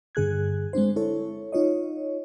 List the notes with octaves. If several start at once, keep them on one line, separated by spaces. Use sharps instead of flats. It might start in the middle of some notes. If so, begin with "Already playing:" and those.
G2 D3 G#4 F#6 G#6
G#3 C4 D4 C5
E4 A4 C#5
D#4 F4 C#5 D#5